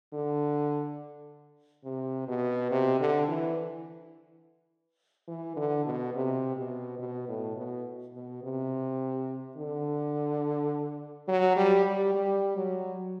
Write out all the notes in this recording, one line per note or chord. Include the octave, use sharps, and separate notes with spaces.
D3
C3
B2
C3
D3
E3
E3
D3
B2
C3
B2
B2
A2
B2
B2
C3
D3
F#3
G3
G3
G3
F#3